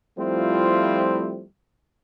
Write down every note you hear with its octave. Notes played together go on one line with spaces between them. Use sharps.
F3 G3 A3 C4 E4 F4